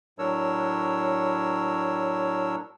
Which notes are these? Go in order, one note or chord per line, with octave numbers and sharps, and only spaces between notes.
A2 F#3 D4 A#4 C#5 E6